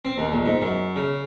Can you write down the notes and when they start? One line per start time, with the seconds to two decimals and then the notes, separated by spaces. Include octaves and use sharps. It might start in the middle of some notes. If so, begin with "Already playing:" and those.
0.05 C4
0.18 D#2
0.32 A#1
0.46 G#2
0.61 F#2
0.96 C#3